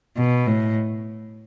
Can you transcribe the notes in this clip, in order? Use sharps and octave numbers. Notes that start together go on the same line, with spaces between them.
B2
A2